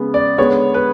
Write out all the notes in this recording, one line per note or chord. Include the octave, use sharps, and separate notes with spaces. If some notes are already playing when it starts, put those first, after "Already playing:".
Already playing: C#3 G#3 B3
D5
D3 G#3 B3 C#5
B4